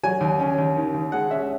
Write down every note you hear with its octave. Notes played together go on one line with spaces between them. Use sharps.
F#3 G#5
D#2
C#4
D#2
D#3
D#2
G#3 F#5
C#4 E5